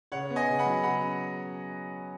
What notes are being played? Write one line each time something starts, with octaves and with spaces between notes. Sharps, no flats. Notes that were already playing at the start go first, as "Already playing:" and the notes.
C#3 C#5 F#5
B3
D#5 G#5
C#3
F#5 B5
F#3
C#3 F#5 B5